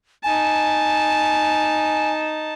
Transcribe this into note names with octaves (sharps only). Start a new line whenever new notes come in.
D#4 G#5 A5